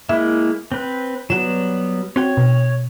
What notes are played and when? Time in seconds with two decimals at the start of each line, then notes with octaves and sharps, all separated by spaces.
0.09 G#3 A#3 E4 E5
0.72 C4 B4
1.30 F#3 G3 B3 F#4 E7
2.16 C4 F#4 C#5 G5
2.37 B2